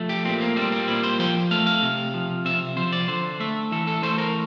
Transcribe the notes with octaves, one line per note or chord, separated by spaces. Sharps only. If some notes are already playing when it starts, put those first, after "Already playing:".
Already playing: F3 A3
G4
A#2 C4
A#3
G3 C4
C4
A#2 E4
C5
F3 G5
A3 F5
F5
C3
F3
C3 E5
F3 C5
D5
D3 C5
A3 E5
E3 A4
A4
A3 C5
A#4